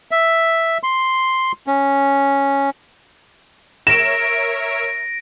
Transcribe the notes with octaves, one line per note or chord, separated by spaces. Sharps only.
E5
C6
C#4
A#4 C#5 E5 A#6 D7 E7